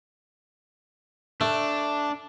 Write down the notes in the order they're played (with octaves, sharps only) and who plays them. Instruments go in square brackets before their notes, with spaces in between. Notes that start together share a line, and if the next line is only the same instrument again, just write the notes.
[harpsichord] A3 [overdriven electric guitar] D4